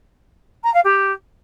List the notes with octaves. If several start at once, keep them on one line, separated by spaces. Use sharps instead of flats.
A#5
F5
G4